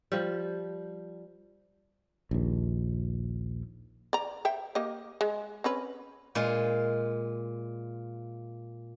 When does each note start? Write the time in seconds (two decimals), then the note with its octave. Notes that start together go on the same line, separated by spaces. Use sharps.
0.12 F3 G3
2.31 A#1 D#2
4.13 D5 A#5
4.45 C5 E5 G5
4.75 A#3 G4 D#5
5.21 G#3
5.64 C4 C#4 B4
6.35 A#2 G#3 F4